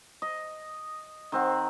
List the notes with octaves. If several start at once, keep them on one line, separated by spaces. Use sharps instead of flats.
D#5
D#3 C4 F#5